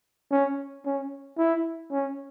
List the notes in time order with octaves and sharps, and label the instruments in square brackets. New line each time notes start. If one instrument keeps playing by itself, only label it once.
[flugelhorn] C#4
C#4
E4
C#4